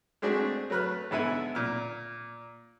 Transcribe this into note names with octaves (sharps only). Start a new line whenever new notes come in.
G#3 A3 C4 D4 F#4 G#4
F#3 A3 B4 F6 F#6
G#2 D3 B3 E4 A4 G#5
A#2 F6